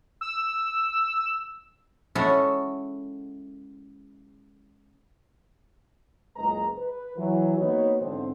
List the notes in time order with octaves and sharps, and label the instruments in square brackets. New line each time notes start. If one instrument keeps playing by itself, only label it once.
[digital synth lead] E6
[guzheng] G#3 C#4 E4 F#4 A4 E5
[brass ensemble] F#1 C#2 G#3 B4 A#5
B4
E3 F#3
A#3 B3 D#4 F#4 B4 C#5
G#2 D3 E3 B3 C4